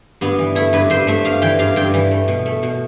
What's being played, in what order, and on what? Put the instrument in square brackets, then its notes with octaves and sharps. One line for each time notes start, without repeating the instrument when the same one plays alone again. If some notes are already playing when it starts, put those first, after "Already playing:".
[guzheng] G2 B3
E3
A3 E4
G2 B4
G2 C5
A3 E5
G2 F5
E3 G5
G2 F5
G2 G5
E3
A3
B2
A3
B2